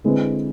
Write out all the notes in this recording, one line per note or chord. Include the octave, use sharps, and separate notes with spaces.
D3 G#3 C4 E4 B4